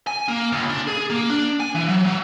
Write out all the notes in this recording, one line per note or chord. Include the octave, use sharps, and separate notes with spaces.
G#5
A#3
C#2
D4
G#4
A#3
D4
G#5
E3
F#3
F#3